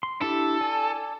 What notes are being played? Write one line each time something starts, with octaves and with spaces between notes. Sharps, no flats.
C6
D4 E4 G4 A4
D5 G#5